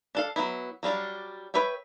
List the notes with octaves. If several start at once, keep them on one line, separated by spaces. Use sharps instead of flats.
D4 A4 F5
F#3 B3 E4
F#3 G3 D4 F5
B4 C#5 E5 G5